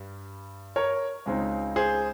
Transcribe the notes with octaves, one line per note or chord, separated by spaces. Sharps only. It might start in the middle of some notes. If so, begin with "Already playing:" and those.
Already playing: G2 G3
A#4 C#5
C#2 C#3 G#3 C4 D#4
G#4 C5